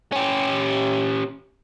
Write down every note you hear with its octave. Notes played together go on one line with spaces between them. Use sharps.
C#4 G4